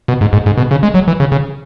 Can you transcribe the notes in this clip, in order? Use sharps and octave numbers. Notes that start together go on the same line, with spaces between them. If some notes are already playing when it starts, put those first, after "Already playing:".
B2
G#2
G#2
G#2
B2
C#3
G#3
F#3
E3
C#3
C#3